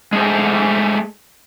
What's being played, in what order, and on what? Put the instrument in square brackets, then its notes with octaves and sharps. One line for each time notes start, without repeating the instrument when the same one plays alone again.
[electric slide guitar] G#3 A3 G#4 C5